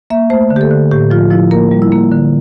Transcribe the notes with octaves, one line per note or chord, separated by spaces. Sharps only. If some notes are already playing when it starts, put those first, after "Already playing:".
A#3 E5
A3 C5
D3
G4
A4
D3
A2 G4
F3 F4
F3 E4
A#3 A#4
G3
E4
A#3
D3